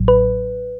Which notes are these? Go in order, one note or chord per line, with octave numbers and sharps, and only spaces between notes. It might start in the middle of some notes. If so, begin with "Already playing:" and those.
Already playing: A1 A2 F#3
B4